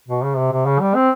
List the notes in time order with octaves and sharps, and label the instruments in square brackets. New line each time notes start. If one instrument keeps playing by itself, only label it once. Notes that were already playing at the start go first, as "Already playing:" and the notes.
[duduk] B2
C#3
C3
C3
C#3
G3
C4